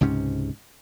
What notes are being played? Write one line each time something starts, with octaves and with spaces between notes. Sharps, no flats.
C#2 G#2 C3 C#4